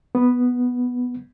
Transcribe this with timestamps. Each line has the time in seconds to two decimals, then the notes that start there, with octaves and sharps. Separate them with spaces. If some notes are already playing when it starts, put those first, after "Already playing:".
0.15 B3